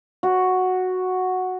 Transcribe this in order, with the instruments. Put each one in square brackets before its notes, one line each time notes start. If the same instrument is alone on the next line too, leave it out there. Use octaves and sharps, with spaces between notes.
[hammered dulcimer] F#4